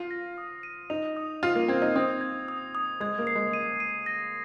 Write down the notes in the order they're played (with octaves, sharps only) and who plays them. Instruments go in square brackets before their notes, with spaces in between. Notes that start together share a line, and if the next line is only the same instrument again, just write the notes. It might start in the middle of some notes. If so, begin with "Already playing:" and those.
Already playing: [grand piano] F4
[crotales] A#6
D#6
D#7
[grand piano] D#4 [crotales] F7
[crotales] D#6
[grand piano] F4 [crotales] F7
[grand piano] A#3
[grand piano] C4 [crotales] G#6
[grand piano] D#4
[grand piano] C4 [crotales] D#6
[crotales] G#6
D#6
D#6
[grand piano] G#3 [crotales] G#6
[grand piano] A#3
[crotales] C7
[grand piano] G#3
[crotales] D#7
D#7
A#6